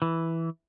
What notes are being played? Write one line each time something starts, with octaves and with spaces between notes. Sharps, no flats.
E3